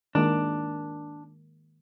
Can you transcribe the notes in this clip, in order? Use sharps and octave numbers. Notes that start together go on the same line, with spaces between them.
D#3 G#3 A#3 D4